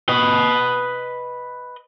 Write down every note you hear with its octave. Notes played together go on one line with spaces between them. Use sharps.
B4 D#5